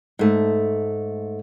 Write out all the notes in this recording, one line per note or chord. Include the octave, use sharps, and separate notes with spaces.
G#2 A3